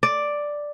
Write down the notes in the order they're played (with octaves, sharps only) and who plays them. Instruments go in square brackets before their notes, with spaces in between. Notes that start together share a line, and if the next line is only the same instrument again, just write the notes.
[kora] D5